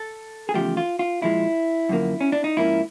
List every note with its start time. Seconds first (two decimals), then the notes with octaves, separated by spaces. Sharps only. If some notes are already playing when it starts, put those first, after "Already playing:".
Already playing: A4
0.49 G#4
0.54 E2 C#3 F3 A3 G4
0.77 F4
0.99 F4
1.22 A#2 F3 G#3 E4
1.89 F#2 D3 F3 A#3
2.21 C#4
2.32 D4
2.44 D#4
2.57 G#2 F3 A#3 C#4 E4